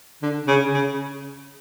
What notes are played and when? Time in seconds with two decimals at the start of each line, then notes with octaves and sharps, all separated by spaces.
0.22 D3
0.47 C#3
0.74 C#3